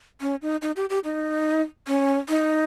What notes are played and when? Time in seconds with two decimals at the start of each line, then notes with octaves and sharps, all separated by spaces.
0.21 C#4
0.42 D#4
0.62 D#4
0.76 G4
0.90 G4
1.04 D#4
1.87 C#4
2.29 D#4